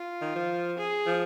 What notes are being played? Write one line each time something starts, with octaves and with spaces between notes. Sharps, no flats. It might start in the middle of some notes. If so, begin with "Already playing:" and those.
Already playing: F4
D#3
F3
G#4
F3